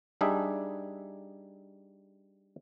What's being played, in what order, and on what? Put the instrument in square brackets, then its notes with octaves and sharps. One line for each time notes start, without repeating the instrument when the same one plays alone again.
[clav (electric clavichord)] G3 D4 D#4 G#4 E5